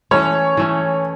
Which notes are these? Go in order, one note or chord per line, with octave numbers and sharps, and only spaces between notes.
E3 A3 C#4 C#5
E3 A3 C#4